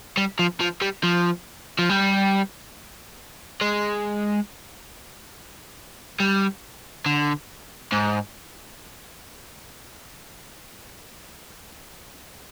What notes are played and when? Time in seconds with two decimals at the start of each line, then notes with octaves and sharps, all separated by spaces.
0.17 G3
0.39 F3
0.61 F3
0.81 G3
1.03 F3
1.79 F3
1.89 G3
3.61 G#3
6.20 G3
7.06 D3
7.92 G#2